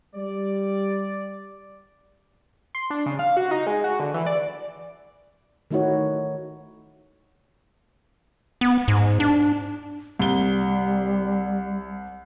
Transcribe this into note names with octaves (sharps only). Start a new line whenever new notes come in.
G3 D5
C6
D4
C#3
F5
F#4
D#4
G#3
F#4
D3
E3
D5
D#3 A3 D#4 E4 F#4 C#5
B3
G#2
D4
C2 G3 G7